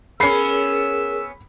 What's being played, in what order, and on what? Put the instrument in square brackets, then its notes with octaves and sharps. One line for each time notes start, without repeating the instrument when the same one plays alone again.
[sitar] B3 C#4 [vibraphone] G#4 A#4 [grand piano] B5 C7 [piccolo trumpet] E6